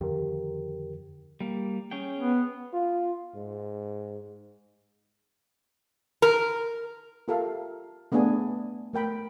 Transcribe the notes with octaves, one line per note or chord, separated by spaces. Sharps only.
F2 D3 D#3 G4 A#4
G3 A#3
C#4 G#4 G5
B3
F4
G#2
A#4
F4 G4 A4 A#4 E5 F5
A3 B3 C4 D4 G#4 G#5
A3 A#4 G5 B5